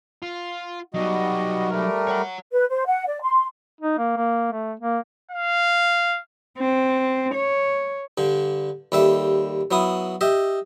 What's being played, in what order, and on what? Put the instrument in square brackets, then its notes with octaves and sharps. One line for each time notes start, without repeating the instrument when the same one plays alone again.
[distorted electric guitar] F4
[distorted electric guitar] F#3 D#4 [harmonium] G3 F#4 D#5
[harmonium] G3 A3 A#4
[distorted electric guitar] C#5 F#5
[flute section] B4
C5
F#5
D5
C6
[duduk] D#4
A#3
A#3
A3
A#3
[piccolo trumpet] F5
[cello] C4
C#5
[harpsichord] G2 D3
D#2 G3 A4 E5
F#3 B3 E4 D#6
G4 D#5 E5